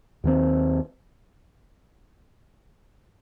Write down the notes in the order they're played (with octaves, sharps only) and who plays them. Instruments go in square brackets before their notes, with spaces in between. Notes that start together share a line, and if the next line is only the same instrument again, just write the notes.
[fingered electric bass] D#2 D#3 G3 C4